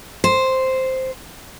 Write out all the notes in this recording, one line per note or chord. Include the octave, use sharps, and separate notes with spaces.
C5